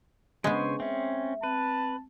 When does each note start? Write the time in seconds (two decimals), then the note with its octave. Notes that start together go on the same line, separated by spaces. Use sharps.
0.44 C#3 G#3 B3 D4 B4 C5 G#5 C#6
0.80 C4 C#4 E5
1.43 C4 B4 A5